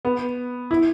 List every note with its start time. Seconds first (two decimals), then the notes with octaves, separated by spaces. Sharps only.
0.05 B3
0.71 E4